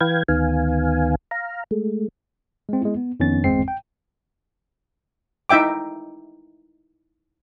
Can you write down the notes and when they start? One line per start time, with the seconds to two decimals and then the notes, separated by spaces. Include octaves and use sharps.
0.01 E3 B4 F5 G5 G#6
0.28 D2 D#3 B3 F5 G#5
1.31 F5 A#5
1.71 G#3 A3
2.69 G#3 C4
2.81 G#3 B3 E4
2.96 B3
3.20 F2 D#3 B3 C#4 D#4 A6
3.44 G1 E2 G#3 C4 C7
3.68 G5
5.49 D#4 E4 E5 G5 D6